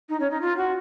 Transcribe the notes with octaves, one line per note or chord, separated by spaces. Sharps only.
D#4
C#4
D#4
F4
F#4